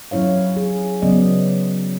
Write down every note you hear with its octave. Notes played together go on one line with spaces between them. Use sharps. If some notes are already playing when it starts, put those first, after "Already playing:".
F#3 C#4 E4 C#5 F5
G#4
C#3 F#3 B3 C#4 D5 D#5